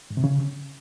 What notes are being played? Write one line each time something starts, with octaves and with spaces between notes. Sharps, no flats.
G#2
C3
C#3